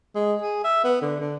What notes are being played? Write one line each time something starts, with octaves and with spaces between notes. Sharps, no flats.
G#3
G#4
E5
B3
D3
D3